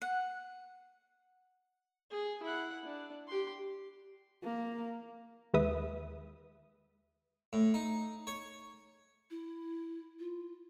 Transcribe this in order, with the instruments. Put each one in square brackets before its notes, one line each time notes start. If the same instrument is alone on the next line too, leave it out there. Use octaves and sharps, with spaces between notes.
[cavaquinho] F#5
[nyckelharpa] G#4
E4 F#5
D4
G4 C6
[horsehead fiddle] A#3
[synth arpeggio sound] D#2 G#3 B4 E5 D#6
[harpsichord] A2
D#4
C#5
[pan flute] E4
F4